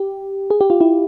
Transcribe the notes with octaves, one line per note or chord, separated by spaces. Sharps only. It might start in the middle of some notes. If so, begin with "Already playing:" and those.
Already playing: G4
G#4
G4
F4
E4